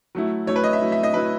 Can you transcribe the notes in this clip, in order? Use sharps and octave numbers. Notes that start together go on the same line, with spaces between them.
F#3 A3 E4
F#3 A3 E4 C#5
B4
D#5
E5
F#3 A3 E4
E5
D#5
F#3 A3 E4 B4